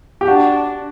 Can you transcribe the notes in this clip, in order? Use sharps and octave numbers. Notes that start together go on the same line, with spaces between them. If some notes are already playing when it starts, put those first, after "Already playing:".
G4
D4 F#4